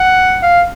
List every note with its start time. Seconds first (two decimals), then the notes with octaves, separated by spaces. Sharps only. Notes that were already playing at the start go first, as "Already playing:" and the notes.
Already playing: F#5
0.43 F5